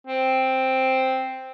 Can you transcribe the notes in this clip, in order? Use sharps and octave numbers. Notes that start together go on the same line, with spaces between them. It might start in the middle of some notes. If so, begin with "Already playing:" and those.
C4